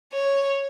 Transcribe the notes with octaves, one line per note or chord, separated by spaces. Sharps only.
C#5